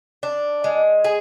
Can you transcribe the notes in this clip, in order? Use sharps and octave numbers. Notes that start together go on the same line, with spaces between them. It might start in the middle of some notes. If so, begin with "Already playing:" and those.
D4
G#3
G#4